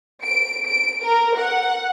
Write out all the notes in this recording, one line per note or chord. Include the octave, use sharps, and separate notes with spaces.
D7
D7
A#4
F#5